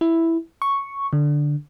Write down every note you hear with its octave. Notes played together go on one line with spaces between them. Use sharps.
E4
C#6
D3